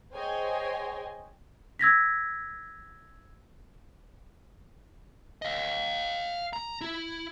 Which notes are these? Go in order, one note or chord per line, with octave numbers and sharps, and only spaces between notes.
G#4 C5 C#5 D#5 G5 G#5
E6 G#6 A#6 B6
D#5 F5
A#5
E4